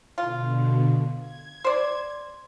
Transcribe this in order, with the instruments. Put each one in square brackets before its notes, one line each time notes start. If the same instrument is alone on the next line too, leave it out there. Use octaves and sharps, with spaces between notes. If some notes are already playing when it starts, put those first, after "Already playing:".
[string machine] B2 D3 [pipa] F4
[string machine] G#6
[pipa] C5 D5